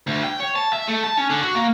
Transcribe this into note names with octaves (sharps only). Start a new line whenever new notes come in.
D2
G5
C#5
A5
E5
A3
A5
C#4
D3
F#4
A#3